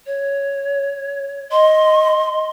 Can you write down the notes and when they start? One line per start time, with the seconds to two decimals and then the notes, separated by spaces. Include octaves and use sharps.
0.06 C#5
1.51 D#5 C6